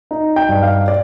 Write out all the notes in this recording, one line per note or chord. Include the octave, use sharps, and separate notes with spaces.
D#4
G5
G2
F5
D5